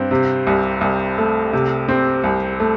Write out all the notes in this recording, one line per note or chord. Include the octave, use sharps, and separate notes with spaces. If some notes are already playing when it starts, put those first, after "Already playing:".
Already playing: G2 C4
C3
C2
C2
A3
C3
C4
C2
A3